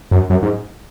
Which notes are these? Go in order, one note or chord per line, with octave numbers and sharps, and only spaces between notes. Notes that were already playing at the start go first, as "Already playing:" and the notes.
F#2
F#2
G#2